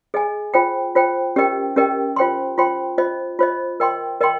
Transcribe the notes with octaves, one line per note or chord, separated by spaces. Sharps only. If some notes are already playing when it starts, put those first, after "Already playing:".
G#4 D#5 G#5
F4 C5 G5
F4 C5 G5
C#4 G4 A#4 D#5 G5
C#4 G4 A#4 D#5 G5
F4 C5 G5 C6
F4 C5 G5 C6
F4 C5 D#5
F4 C5 D#5
A#4 D#5 G5 C6
A#4 D#5 G5 C6